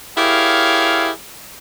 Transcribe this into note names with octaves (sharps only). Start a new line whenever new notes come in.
E4 G4 G#4 A#4 C#5 F5